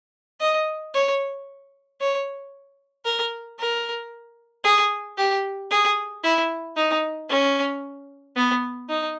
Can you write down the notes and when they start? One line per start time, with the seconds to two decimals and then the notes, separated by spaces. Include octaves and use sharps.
0.40 D#5
0.94 C#5
2.00 C#5
3.05 A#4
3.59 A#4
4.64 G#4
5.17 G4
5.71 G#4
6.24 E4
6.77 D#4
7.29 C#4
8.36 B3
8.89 D#4